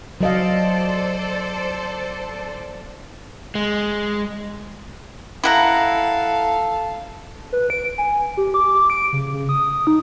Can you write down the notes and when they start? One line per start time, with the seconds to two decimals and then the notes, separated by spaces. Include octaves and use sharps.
0.21 F#3 A4 C5 D5 D#5 F5
3.55 G#3
5.44 E4 A4 F5 F#5 A#5
7.53 B4
7.70 D7
7.98 G#5
8.37 G4
8.54 D6
8.90 D7
9.13 C#3
9.34 C#3
9.49 D#6
9.87 D#4